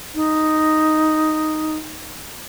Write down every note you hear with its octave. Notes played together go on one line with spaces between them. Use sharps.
D#4